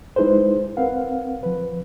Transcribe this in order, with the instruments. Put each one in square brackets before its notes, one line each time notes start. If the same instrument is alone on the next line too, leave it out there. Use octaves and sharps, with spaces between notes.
[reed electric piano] G#3 D#4 E4 G#4 B4 C5
C4 A#4 B4 F5 F#5
F3 B4